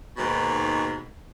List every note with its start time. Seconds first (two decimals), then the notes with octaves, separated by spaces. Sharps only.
0.17 D#2 G#2 B2